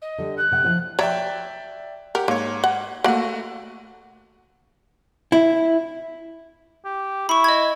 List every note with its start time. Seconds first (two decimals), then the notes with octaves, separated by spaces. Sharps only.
0.01 D#5
0.18 D3 G3
0.37 F#6
0.52 C3 F#5
0.64 F3 E4 C5
0.99 C#5 D5 E5 G5 A#5
2.15 G4 A#4 F#5
2.28 G#2 A#3 C#5
2.64 F#5
3.04 A3 A#3 F#4 F#5
5.32 E4
6.85 G4
7.29 E4 B5 C#6
7.44 D#5 G#6